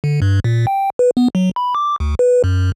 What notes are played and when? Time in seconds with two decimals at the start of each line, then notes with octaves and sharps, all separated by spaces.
0.04 D3
0.22 G2
0.44 A#2
0.67 G5
0.99 B4
1.17 B3
1.35 F#3
1.56 B5
1.75 D6
2.00 D2
2.19 B4
2.44 F#2